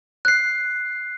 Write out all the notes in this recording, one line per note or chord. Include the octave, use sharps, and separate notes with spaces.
F#6 C7